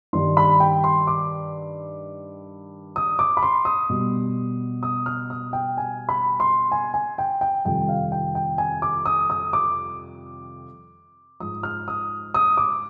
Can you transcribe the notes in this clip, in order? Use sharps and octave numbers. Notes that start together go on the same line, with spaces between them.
G2 D#3 G3 C6
B5
G5
C6
D6
D#6
D6
B5
C6
D#6
B2 G3
D#6
F6
D#6
G5
G#5
B5
C6
G#5
G#5
G5
G5
F2 C3 D#3 G3 G5
F5
G5
G5
G#5
D6
D#6
D#6
D6
G#2 F3 D#6
F6
D#6
D#6
D6